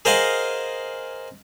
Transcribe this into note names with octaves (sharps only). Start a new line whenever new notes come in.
G#4 A#4 C5 D#5 F5 F#5